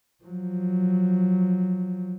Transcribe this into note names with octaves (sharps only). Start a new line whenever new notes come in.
F3 F#3